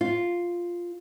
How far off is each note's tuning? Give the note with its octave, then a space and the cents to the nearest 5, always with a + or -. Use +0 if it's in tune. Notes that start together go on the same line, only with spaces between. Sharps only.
F4 +0